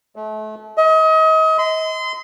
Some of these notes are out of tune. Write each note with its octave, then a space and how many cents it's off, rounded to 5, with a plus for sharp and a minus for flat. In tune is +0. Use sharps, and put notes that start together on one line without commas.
A3 -35
D#5 +35
C6 -30